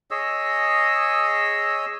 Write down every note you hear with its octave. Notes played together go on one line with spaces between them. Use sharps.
G#4 C#5 D#5 E6